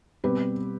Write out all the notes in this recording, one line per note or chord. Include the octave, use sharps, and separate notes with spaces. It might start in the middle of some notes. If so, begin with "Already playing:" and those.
B2 G3 C4 G4 B4